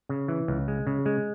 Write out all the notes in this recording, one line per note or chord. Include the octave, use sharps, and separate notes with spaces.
C#3
E3
C#2
G#3
C#3
G#3